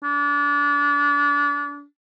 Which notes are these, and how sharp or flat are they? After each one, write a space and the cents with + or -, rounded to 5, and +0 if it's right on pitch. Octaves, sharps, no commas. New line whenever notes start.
D4 -30